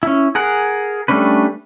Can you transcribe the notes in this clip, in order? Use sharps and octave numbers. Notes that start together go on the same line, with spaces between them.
C#4 E4
G#4 A#4 F#5
G3 A3 C#4 D4 B4